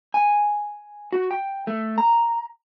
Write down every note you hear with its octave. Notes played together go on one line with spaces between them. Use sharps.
G#5
F#4
G5
A3
A#5